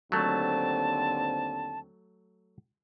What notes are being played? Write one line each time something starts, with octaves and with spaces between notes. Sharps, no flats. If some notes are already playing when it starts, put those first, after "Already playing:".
D#2 D3 F#3 A3 C4 A5